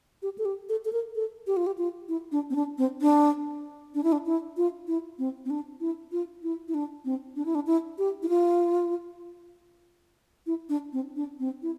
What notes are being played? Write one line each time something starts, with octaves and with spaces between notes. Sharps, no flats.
G4
A4
G4
A4
A4
A#4
A4
G4
F4
G4
F4
E4
D4
C4
D4
C4
D4
D4
E4
D4
E4
F4
E4
C4
C4
D4
E4
F4
E4
E4
D4
C4
D4
E4
D4
E4
G4
E4
F4
E4
D4
C4
D4
C4
E4